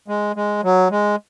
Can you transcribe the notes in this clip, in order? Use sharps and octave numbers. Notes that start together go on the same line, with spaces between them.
G#3
G#3
F#3
G#3